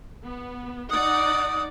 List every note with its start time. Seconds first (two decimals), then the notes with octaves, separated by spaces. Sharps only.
0.25 B3
0.91 D#4 D5 F#5 D#6